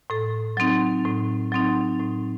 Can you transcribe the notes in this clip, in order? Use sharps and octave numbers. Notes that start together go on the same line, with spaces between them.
A2 A4
F#3 C4 D#4
A2
F#3 C4 D#4
A2